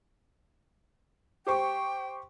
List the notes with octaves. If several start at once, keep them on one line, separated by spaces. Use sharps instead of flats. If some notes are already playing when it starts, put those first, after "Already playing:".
G4 C5 G5 C#6